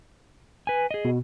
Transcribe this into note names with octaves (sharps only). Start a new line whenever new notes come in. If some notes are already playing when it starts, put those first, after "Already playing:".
B4 G#5
G#4 D#5
B2